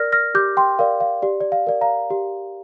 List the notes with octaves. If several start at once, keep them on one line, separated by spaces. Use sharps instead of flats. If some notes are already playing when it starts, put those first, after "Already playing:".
Already playing: A#4 D5 F6 A#6
F6 A#6
G4 D6 G6
G5 C6
A#4 D5 F5
F5
G4 D5
D5
F5
A#4 D5
F5 A#5
G4